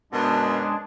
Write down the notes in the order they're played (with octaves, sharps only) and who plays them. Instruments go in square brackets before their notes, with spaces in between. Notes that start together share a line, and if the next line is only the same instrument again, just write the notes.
[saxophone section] F#2 B2 [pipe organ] G#3 D4 [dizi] A5